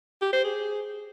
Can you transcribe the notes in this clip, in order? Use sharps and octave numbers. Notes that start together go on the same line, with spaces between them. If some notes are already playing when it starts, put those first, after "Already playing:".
G4
C5
G#4